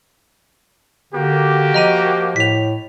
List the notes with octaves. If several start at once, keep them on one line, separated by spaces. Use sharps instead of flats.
D3 A#3 F#4 G4
F3 D#5 A#5 D#7
A2 B6 F7